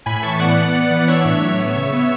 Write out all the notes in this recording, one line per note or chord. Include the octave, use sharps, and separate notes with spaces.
A2 G#5 B5
E3 A5 C#6
B3 D5 F#5
B3
B3
E3
D4 C#5 E5
A2
F#3
B3
C#3
B3